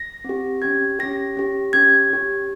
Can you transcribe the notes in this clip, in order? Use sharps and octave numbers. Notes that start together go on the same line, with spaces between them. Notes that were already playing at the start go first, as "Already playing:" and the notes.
Already playing: A#6
C4 G4
C#4 G4 G#6
C#4 G4 A#6
C#4 G4
C#4 G4 G#6
C#4 G4